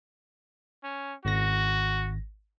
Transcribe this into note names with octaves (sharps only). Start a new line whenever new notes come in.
C#4
G#1 F#4 A#6